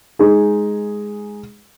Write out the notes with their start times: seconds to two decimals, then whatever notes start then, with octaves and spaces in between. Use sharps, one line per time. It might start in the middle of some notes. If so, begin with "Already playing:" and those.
0.19 G#3 D#4 G#4